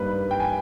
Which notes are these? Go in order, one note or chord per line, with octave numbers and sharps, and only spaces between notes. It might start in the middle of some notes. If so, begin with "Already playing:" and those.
Already playing: G2 G3 A#3 D#4 B4
G5
G#5